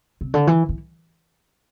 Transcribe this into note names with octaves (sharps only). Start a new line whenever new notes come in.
C3
D3
E3
E3